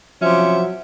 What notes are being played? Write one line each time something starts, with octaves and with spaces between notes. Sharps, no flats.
C3 F3 F#3 C#4 E5